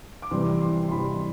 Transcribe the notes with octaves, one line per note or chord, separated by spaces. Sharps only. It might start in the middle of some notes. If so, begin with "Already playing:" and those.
D6
C3 E3 G3 C6
C6
C6
C3 E3 G3 B5